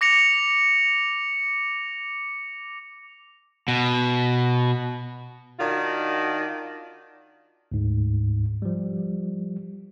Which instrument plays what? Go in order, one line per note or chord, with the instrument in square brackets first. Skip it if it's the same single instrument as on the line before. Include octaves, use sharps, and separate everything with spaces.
[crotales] D6 A#6 C#7 F7
[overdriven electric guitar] B2
[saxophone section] D#3 D4 F4 F#4
[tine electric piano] D2 G#2
F3 G3